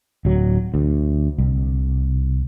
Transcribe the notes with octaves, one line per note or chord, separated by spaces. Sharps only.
D1 F#3
D2
C2